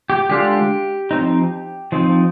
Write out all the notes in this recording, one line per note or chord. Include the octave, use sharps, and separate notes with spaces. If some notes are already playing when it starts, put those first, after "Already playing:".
G4
D3 G#3 D4 F4 G4
F3 C4 D#4
F3 C4 D#4